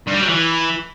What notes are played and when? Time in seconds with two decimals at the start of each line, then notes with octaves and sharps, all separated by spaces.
0.07 G2
0.14 G3
0.22 F#3
0.29 E3